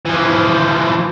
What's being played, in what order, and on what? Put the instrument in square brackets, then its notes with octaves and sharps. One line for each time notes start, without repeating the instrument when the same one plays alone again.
[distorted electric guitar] E3 F3